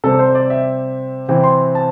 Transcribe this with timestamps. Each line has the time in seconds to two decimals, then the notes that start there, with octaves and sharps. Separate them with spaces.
0.04 C3 G3 C4 A4
0.19 C5
0.35 D5
0.50 E5
1.28 C3 E3 C4 G5
1.44 C6
1.75 A5